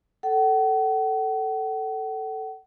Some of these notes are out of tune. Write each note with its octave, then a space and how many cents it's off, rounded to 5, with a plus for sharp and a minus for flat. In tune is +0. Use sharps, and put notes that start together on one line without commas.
A4 +0 F#5 +40